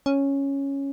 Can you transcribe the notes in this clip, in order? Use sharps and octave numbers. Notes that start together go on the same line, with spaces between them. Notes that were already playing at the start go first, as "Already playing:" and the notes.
C#4